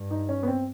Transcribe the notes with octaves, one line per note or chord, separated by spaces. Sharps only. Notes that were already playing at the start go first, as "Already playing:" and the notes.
Already playing: G2
D#4
C#4
B3
C4